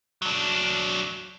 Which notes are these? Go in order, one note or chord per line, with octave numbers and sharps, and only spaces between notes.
F#3 D4